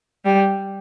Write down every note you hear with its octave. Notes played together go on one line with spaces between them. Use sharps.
G3